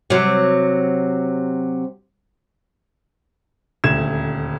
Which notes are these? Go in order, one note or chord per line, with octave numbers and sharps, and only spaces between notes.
C3 F#3
D#1 D2 G#6 E7